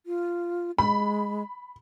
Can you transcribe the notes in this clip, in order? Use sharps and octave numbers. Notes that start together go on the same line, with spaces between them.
F4
G#3 B5